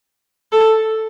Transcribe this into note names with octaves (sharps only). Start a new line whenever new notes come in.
A4